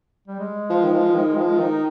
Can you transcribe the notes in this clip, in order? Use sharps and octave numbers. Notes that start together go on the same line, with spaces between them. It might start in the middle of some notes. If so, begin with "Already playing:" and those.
G3
G#3
F3
D#3
F3
D#3
F3
D#3 D#4